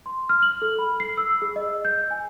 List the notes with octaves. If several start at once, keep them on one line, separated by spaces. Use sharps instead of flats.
C6
F6
F#7
A4
B5
C7
E6
G#4
D#5
G6
G#5